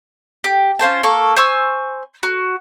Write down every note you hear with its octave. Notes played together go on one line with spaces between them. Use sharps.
G4
C#4 F4 C5 A5
A#3 A4 C#6
C5 G#5 C#6 E6
F#4